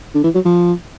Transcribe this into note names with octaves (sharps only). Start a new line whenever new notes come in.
D3
E3
F#3
F3